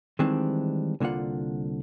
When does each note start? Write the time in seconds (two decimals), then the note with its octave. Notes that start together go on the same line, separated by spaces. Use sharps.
0.19 D#3 E3 G3 G#3 C4 D4
1.00 C2 D3 A#3 F4 F#5